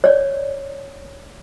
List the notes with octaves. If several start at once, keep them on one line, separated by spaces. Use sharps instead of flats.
C#5 D5